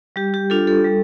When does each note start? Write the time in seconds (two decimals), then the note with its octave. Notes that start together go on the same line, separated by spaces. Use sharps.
0.16 G3 G4
0.34 G4
0.50 D4 F4 A4
0.67 A4
0.84 G3